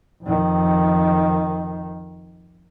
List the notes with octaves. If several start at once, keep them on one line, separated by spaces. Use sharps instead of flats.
F2 D#3